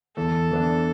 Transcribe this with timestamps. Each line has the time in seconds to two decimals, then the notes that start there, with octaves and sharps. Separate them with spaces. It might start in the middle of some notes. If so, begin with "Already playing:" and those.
0.16 E2 A4
0.51 E3 B3 D4